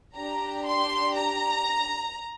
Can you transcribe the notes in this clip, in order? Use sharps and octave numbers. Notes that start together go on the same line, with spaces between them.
D4 G4 A#5
C6
A#5